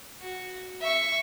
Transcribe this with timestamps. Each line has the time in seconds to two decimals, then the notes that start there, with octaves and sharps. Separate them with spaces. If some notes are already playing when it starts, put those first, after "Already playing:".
0.20 F#4
0.81 E5 C#6